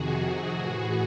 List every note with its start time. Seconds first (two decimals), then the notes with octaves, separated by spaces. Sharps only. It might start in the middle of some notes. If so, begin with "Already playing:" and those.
Already playing: F2 C3 D#3 F#4 G#4
0.52 A2 E3